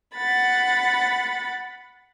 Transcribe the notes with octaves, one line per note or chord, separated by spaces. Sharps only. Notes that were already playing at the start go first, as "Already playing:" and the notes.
F#5 B5 A6